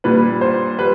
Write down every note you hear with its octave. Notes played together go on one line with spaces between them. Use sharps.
A#2 G3 B4
C5
G3 B4